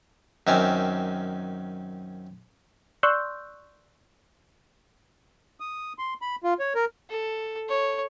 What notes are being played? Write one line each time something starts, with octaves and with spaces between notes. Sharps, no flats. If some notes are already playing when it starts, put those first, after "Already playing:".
F#2 D#3 C4 C#4
D5 C6 C#6 E6 F#6 G6
D#6
C6
B5
F4
C#5
A#4
A4
C#5